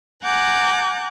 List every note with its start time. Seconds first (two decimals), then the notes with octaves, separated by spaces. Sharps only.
0.24 F#5 G#5 A#5 D6 F#6 G6